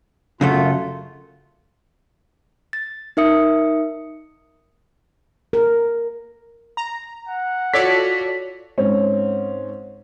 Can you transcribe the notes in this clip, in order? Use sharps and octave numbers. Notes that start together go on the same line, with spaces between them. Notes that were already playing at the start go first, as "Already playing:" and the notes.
F#2 C#3 F#3 A3 F4
A6
D#4 A#4 E5 D#6 C#7
A#4
A#5
F#5
F4 F#4 A4 C#5 D5 B6
G#2 C4 C#4